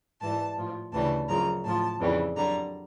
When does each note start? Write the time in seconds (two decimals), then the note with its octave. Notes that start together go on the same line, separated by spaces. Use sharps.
0.21 G#2 E3 G3 A5
0.57 A2 F3
0.92 D2 C#3 E3 G3 A5
1.29 F#2 C#3 F3 A#5
1.65 A2 F3 A5
2.00 F2 C#3 E3 G3
2.36 F#2 D3 G3 A#5